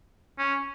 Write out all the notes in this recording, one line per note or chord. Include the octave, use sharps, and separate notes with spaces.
C#4